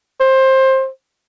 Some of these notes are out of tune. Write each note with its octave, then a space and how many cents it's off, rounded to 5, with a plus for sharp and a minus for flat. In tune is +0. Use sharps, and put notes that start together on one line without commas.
C5 +20